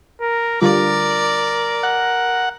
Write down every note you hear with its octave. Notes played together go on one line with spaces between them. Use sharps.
A#4
D3 G3 F4 A#4 D5
F#5